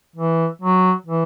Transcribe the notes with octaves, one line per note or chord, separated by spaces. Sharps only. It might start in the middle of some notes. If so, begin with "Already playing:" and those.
E3
F#3
E3